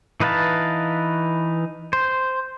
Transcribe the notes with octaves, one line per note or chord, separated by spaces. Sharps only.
E3 D#4 B4 F5 A5
C5